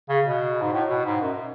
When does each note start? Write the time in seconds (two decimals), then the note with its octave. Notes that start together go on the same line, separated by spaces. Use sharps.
0.09 C#3
0.26 B2
0.62 G#2
0.73 A2
0.89 B2
1.05 G#2
1.21 F#2